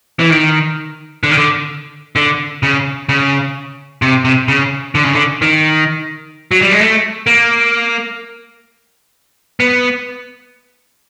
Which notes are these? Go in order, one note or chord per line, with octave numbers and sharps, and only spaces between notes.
E3
D#3
D3
D#3
D3
D3
C#3
C#3
C3
C3
C#3
D3
C#3
D3
D#3
F#3
G3
G#3
A3
A#3
B3